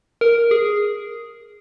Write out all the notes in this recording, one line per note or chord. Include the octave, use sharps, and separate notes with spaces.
A#4
G#4